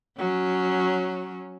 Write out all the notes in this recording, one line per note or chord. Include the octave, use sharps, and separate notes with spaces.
F#3 C#4